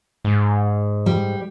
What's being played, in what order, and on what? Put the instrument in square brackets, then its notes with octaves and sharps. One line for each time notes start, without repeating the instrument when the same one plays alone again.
[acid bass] G#2
[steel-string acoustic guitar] G3